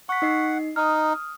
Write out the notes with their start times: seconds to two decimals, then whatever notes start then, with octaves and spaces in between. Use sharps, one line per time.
0.09 F#5 C#6 B6
0.22 D#4 D#5 C7
0.76 D#4 D#6 F6